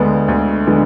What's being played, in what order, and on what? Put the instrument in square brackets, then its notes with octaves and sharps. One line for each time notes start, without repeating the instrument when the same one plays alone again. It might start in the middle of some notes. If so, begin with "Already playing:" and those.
Already playing: [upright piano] D2 D3 G#3 B3 D4
D2
D3 G#3 B3 D4